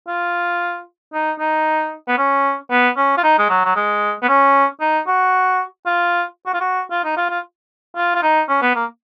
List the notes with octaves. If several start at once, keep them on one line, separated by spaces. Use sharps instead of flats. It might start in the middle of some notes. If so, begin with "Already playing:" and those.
F4
D#4
D#4
B3
C#4
B3
C#4
F4
D#4
G#3
F#3
F#3
G#3
B3
C#4
D#4
F#4
F4
F#4
F4
F#4
F4
D#4
F4
F4
F4
F4
D#4
C#4
B3
A#3